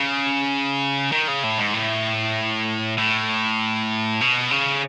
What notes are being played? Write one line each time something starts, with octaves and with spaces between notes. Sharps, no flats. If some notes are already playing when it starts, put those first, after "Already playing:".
Already playing: C#3
D#3
C#3
A2
G#2
A2
A2
B2
C#3